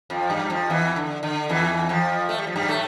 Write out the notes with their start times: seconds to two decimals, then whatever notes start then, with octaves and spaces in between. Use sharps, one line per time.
0.10 F2 F3
0.30 G2 G3
0.50 F2 F3
0.70 E2 E3
0.96 D3
1.23 D3
1.50 E2 E3
1.89 F2 F3
2.29 A3
2.38 G3
2.47 F3
2.56 G2 G3
2.68 A2 A3